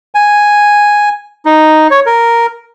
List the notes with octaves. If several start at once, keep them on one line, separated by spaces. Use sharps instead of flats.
G#5
D#4
C#5
A#4